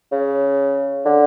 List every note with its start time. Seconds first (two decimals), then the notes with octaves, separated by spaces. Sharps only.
0.12 C#3
1.05 D3